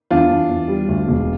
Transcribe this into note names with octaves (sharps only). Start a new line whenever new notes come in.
E2 D4 F4
E2
E2
G3
D2
E1